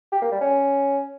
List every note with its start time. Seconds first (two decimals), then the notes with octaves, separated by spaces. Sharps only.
0.12 G4
0.22 A#3
0.31 G3
0.41 C#4